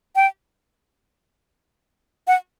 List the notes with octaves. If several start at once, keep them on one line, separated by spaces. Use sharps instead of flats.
G5
F#5